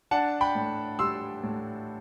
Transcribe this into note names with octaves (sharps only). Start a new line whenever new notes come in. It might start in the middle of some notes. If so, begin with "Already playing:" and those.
D4 F#5 A5
G5 B5
A2
G3 C6 E6
A2